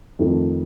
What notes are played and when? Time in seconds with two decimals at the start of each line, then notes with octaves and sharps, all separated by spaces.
0.19 F2 D#3 A3